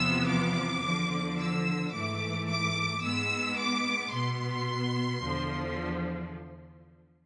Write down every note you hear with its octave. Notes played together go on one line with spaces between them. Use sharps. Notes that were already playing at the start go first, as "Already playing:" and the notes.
Already playing: E2 C3 F3 B3 E6
D6
E2 D3 F3
E6
G#2 E3 A3 D6
D6
G#2 G#3 B3 E6
D6
B2 B3 C6
E2 D3 F3